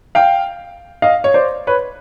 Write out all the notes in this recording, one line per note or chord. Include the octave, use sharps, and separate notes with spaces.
F5 G5
D#5 F5
C#5
C5 D5
B4 C#5